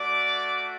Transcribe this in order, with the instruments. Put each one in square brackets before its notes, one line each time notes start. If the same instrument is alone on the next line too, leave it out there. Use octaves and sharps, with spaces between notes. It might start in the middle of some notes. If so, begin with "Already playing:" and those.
Already playing: [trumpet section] A3 F#4 D5 D6